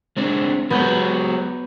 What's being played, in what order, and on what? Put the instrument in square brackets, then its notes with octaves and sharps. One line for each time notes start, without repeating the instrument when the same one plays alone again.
[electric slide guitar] G#3 C4 D4
[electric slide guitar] F#3 G#3 F#4 [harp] B3 G6